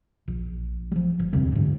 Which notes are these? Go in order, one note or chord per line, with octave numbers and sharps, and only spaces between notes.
A#1
F3 G3
G1
E1 D2 C3 G3
G#2 D3